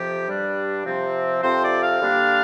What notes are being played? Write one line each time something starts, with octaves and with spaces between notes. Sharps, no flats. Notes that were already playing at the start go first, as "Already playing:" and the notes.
Already playing: F2 C3 F3 G4
G2 G3 D4
C3 F3 C4
F2 C3 F3 C4 C5
D5
F5
D3 G3 A#3 D4